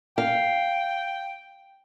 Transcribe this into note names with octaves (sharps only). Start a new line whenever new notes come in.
F5 G5